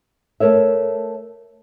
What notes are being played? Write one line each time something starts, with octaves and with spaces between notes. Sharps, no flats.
A3 A#4 C#5 E5